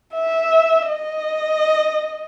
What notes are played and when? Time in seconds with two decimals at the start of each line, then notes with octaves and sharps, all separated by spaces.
0.14 E5
0.90 D#5